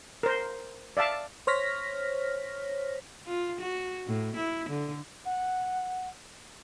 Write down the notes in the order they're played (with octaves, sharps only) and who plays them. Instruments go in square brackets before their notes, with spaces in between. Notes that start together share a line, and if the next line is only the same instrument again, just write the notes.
[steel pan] A#4 C5
D5 E5 F5 A5
[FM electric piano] C5 C#5 F6 A#6 B6
[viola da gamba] F4
F#4
A2
E4
D3
[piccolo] F#5